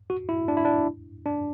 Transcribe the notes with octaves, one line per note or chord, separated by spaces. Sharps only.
F#4
E4
D4
E4
D4
D4